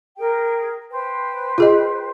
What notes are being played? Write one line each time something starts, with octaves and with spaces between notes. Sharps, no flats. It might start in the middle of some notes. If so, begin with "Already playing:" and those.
G#4 A#4 G5
B4 C5 G5
F4 G#4 D#5